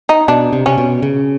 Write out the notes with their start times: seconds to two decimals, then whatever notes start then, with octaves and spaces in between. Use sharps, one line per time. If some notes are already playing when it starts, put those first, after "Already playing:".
0.09 D#4
0.28 B2 D4
0.53 C3
0.66 C3 C#4
0.78 B2
1.03 C#3